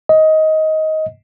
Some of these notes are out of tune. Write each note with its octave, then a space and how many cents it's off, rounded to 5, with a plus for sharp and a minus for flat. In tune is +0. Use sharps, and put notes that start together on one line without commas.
D#5 +15